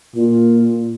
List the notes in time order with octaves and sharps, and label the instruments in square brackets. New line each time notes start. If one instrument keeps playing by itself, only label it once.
[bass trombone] A#2 [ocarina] F4